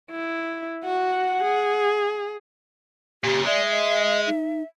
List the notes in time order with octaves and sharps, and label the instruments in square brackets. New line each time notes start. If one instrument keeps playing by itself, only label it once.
[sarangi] E4
[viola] F#4 [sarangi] F#5
[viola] G#4
[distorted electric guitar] A#2 C#3 [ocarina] G4
[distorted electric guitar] G#3 [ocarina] D5 [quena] E5
[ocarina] D#5
D#4